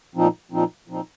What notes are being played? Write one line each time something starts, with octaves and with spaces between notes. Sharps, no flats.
A#2 F3 C4 D#4
A#2 F3 C4 D#4
A#2 F3 C4 D#4